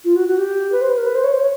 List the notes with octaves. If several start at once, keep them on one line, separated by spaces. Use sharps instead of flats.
F4
F#4
F#4
G4
B4
C5
B4
A#4
B4
C5
C#5
C5
C#5